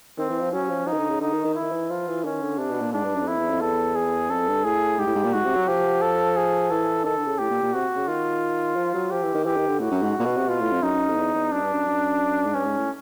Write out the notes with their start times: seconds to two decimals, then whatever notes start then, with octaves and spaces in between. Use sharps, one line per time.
0.18 D#3 C4
0.30 E3
0.40 F3
0.52 F#3 C#4
0.69 F3
0.86 F3 D#4
0.93 D#3
0.98 D3
1.10 C#3
1.21 D3 D#4
1.33 D#3
1.45 D#3
1.55 E4
1.62 D#3
1.72 E3
1.90 F3 F4
2.08 E3
2.25 D#3 C#4
2.42 D3
2.58 C3 D4
2.70 B2
2.81 A#2
2.93 G#2 D4
3.04 G2
3.15 F#2
3.22 E2
3.27 F2 E4
3.38 E2
3.50 F2
3.61 E2 A4
3.96 G#4
4.30 F2 A4
4.48 G2
4.64 A2 G#4
4.98 G#2 G4
5.07 A2
5.15 G#2
5.24 A#2
5.33 G#2 F#4
5.45 C3
5.56 F#3
5.68 F3 G4
6.02 A4
6.37 G#4
6.71 E3 A4
7.05 D#3 A4
7.17 D3
7.27 C#3
7.39 A2 G4
7.51 A#2
7.63 A#2
7.74 C3 F#4
7.96 C#3
8.08 D#3 F4
8.76 F3
8.94 F#3
9.11 F3 G4
9.23 E3
9.34 D#3
9.45 E3 G4
9.57 D#3
9.68 D3
9.80 A2 F#4
9.92 F#2
10.03 G#2
10.20 A#2
10.25 B2
10.37 C3
10.48 B2 F4
10.60 A2
10.72 F2
10.82 F#2 D#4
11.10 F2
11.16 E2
11.35 E2
11.52 F#2 D4
11.62 G2
11.73 F#2
11.86 F#2
12.46 G#2
12.54 G2 C#4
12.66 G#2
12.77 A2